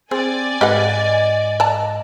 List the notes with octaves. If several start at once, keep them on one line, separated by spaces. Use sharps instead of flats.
C4 G#4 D5 G#5
G#2 G4 B4 D#5 F#5
D5 A5 A#5